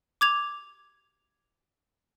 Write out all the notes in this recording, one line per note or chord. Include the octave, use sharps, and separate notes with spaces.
D6 G#6 F7